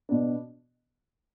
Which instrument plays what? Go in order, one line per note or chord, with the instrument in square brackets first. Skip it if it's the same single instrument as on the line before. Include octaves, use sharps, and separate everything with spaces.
[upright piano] B2 B3 D4